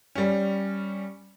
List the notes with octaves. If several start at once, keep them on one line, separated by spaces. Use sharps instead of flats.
G3 C#4